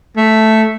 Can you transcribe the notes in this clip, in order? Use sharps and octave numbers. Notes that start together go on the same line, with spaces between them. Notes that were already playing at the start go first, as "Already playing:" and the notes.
A3